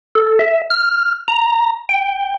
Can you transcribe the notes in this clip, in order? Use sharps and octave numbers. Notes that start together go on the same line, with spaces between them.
A4
E5
F6
A#5
G5